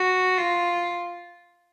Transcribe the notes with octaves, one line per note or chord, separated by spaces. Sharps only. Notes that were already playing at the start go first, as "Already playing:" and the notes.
Already playing: F#4
F4